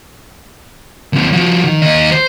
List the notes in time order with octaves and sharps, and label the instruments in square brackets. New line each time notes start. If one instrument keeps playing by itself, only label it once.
[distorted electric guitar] D#2 C4
F3 F#4
D#3
D#2 D#5
C5